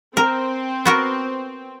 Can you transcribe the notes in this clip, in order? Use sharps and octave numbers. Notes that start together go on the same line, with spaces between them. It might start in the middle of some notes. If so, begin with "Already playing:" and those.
C4 A#4
B3 F#4 A#4